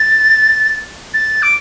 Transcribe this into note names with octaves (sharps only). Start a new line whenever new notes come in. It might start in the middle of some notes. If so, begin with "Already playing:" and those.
Already playing: A6
A6
D6